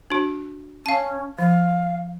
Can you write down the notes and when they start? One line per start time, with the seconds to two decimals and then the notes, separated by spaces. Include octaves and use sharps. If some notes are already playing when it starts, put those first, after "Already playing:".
0.10 D4 F#4
0.86 C#4 F5 A5
1.39 F3 F5